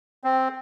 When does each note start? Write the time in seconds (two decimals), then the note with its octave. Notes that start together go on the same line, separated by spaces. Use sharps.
0.24 C4